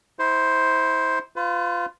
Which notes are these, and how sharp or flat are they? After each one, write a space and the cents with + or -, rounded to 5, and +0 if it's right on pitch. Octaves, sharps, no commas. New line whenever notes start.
E4 -30 C5 +0
F4 +0 B4 +40